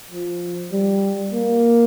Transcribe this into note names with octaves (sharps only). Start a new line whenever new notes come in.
F3
G3
A#3